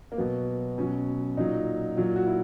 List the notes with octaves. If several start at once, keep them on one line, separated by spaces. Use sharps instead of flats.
A#3
B2 F#3 B3
B2 F#3 C#4
A#2 F#3 D#4
A#2 F#3
F#4
E4